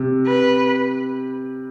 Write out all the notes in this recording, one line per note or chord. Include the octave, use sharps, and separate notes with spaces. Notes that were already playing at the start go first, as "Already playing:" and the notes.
Already playing: C3
B4